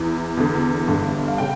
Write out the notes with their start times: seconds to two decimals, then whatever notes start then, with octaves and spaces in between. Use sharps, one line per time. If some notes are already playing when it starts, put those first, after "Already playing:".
Already playing: E2 E3
0.37 E2 D3
0.88 G1 G2 D3
1.28 F5
1.38 C#3 G5